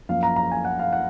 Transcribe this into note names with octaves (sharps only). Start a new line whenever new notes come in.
F#2 F3 A#3 F5
A#5
A#5
G#5
F#5
F5
F#5